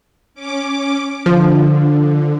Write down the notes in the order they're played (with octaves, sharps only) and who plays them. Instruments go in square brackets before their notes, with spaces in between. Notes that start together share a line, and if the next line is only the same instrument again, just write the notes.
[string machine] C#4 D6
[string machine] D3 [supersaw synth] F3